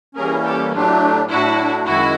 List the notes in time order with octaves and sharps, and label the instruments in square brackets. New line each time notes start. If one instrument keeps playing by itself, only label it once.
[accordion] E3 G3 A#3 C#4 [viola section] G#4 A#4
[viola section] G4 A4
[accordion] A2 F#3 A3 D4 [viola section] F4 G4
[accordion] A2 F#3 A3 D4 [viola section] E4 F#4
[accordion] F#2 D#3 G#3 [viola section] E4 F#4